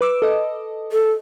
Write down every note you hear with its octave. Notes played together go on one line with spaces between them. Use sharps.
B4 D6 E6
A4 D#5
A4